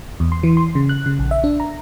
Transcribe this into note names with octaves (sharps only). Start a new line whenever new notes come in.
E2
C6
E3
C6
C#3
F#6
C#3
A#1
E5
D4
A#5